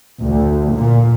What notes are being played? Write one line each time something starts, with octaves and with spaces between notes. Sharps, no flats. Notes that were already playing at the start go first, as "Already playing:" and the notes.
D2
A#2